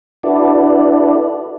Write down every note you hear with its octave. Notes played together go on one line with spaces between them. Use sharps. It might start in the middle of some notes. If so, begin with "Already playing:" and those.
D4 E4 F#4 A4 B4 D5